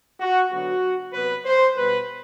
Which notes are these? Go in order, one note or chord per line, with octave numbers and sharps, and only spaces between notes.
F#4
D3 F#3 B3 F#4
C3 F#3 B3 B4
C5
B2 G3 B3 B4